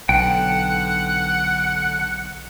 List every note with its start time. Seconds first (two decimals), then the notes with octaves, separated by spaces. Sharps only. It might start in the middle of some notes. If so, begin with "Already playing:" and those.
0.09 B1 D3 F#5 G5